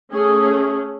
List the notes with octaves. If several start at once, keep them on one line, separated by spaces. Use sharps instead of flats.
A3 C#4 G#4